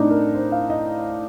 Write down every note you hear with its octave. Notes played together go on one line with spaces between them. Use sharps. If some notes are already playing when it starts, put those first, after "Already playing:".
Already playing: A2 A3 C4 D4 D#4
A#4
C5
F5
D#5